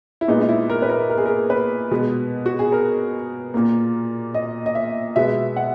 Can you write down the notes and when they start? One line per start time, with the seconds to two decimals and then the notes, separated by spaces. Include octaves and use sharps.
0.21 E4
0.28 A#2 G#3 B3 D#4
0.41 D#4
0.49 E4
0.70 A#4
0.82 B4
0.89 A#4
1.10 A#4
1.18 G#4
1.26 A#4
1.50 B4
1.91 B2 G#3 B3
2.46 F#4
2.59 G#4
2.72 A#4
3.54 A#2 A#3
4.34 D#5
4.66 D#5
4.75 E5
5.16 B2 G#3 B3 E5
5.56 F#5